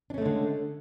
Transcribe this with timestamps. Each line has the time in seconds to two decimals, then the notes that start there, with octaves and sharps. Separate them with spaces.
0.10 D4
0.14 C#4
0.18 A3
0.22 G#3
0.26 D3